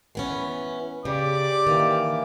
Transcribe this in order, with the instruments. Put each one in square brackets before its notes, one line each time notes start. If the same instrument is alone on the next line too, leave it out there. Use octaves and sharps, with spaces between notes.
[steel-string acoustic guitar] E3 B3 C#4
[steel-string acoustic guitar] C#3 [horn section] G4 D5 [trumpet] D6
[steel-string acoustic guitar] D#3 [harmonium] E3 A#3